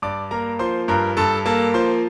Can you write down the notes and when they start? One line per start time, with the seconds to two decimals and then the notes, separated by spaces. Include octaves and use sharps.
0.02 G2 D5 D6
0.31 A#3 A#4 A#5
0.59 F3 C5 C6
0.88 G2 A#4 A#5
1.17 G2 A4 A5
1.45 A#3 A4 A5
1.74 F3 C5 C6